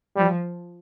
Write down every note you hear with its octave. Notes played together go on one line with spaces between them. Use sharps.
F3 G3